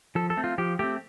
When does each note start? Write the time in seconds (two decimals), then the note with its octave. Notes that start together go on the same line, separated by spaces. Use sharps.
0.15 F3 A4
0.30 A4
0.37 A3 C4
0.44 F4
0.58 F3 G4
0.79 A3 C4 G4